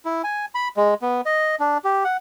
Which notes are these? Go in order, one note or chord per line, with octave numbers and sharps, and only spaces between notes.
E4
G#5
B5
G#3
B3
D#5
D4
G4
F#5